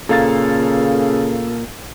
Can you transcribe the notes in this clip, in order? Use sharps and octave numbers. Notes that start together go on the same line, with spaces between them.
A#2 C#3 A4 F5 A6